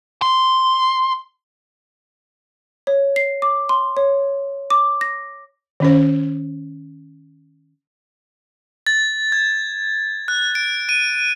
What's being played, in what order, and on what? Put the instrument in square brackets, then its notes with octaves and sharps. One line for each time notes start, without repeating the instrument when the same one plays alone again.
[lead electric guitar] C6
[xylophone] C#5
C7
D6
C6
C#5
D6
A#6
[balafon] D#3 C#4 C5
[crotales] A6
G#6
F#6
D7
D#7